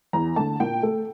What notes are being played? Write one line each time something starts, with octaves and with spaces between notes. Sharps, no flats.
E2 A#5
D3 A3 A5
A#2 G5
A3 A4